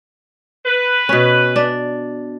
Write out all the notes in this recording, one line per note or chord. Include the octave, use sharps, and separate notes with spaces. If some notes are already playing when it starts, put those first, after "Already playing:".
B4
B2 C#4
D4